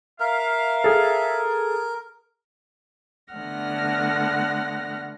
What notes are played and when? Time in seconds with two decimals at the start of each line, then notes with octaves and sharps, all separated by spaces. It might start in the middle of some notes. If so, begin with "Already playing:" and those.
0.20 A#4 E5 F5
0.84 G#4 A4
3.34 D3 A3 B3 F#5 F6 A#6